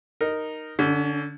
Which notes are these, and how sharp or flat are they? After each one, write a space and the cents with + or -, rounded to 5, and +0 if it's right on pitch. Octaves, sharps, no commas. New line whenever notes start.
D#4 -5 A#4 +0
D3 +0 C#4 +35